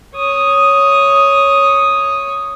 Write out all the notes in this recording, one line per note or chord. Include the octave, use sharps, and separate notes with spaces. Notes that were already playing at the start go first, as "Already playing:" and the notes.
C#5 D#6